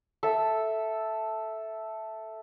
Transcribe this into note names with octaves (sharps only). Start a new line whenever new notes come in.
A4 E5